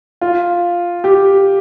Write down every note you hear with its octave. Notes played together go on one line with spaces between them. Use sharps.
F4
G4